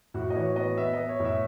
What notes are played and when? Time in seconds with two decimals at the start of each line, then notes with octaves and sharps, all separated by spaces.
0.14 A2 F#4
0.30 D#5
0.35 E3 C#5
0.56 B3 D#5
0.77 B3 E5
0.93 D#5
0.99 B3
1.09 C#5
1.20 A2
1.25 E5